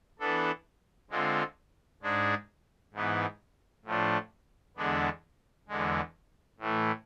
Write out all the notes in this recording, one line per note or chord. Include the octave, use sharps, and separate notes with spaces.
E3 B3 D4 A4
D3 G#3 C4 F4
G#2 G#3 D4 G#4
G#2 E3 B3
A2 F3 A3 D4
E2 D3 G#3 B3 D4
E2 D3 G#3
A2 E3 A3